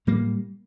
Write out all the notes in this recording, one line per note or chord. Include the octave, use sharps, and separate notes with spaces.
A2 G3 A#3